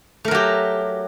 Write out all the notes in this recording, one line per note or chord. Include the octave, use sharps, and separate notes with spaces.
F#3 A3 G4 A#4